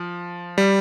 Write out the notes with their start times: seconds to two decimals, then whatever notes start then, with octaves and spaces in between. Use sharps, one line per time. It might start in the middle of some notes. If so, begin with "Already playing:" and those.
Already playing: F3
0.58 G3